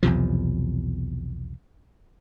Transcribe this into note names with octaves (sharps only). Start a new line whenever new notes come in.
B1 E2 C3 F3